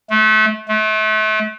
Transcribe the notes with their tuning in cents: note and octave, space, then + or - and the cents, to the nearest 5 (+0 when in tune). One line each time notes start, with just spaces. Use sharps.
A3 -30
A3 -35